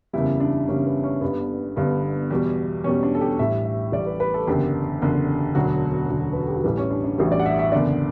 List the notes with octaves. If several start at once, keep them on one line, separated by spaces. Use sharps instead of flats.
F#1 E2 C#3 G3 E4
D4
F#1 E2 C#3 G3 C#4
B3
C#4
G1 G2 D3 B3
G1 G2 D3 B3
E2 B2 G3
E2 B2 G3 C#4
D4
A4
G4
A1 A2 G3 E5
E5
A1 A2 G3 D5
B4
B4
A4
F#1 E2 D3 G4
F#1 E2 D3
E1 D2 D3 F#3 F#4
E1 D2 D3 F#3
B4
A4
G4
F#4
A1 A2 E3 G3 E4
C#4
D4
D4
A1 A2 E3 G3 F#4
D5
F#5
E5
E5
F#1 E2 D3 D5